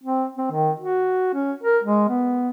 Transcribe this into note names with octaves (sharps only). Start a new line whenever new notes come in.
C4
C4
D#3
F#4
C#4
A#4
G#3
B3